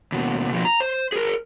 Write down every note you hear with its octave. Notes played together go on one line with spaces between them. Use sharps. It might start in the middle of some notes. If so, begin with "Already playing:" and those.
D#2 B2
B2 F3
A#5
C5
G#4 A#4